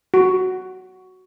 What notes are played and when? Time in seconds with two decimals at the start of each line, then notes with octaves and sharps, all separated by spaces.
0.14 F#4